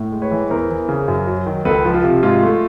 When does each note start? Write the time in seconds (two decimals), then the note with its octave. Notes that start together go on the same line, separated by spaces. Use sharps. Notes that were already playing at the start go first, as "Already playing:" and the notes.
Already playing: A2
0.12 G#3
0.22 B4 C#5
0.31 E3
0.50 E2 A#4 C5
0.70 E3
0.89 C#3
1.08 F#2
1.27 F#3
1.46 D#3
1.65 C#2 A4 B4
1.85 F3
1.94 F4
2.04 C3
2.23 G#2 F4
2.43 A3